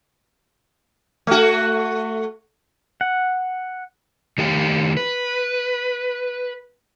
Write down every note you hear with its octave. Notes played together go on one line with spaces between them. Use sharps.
A3 F#4
F#5
D#3 A3 G4 F5 G5
B4